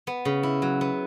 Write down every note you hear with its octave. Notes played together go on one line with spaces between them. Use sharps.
B3
C#3
E4
F#3
B3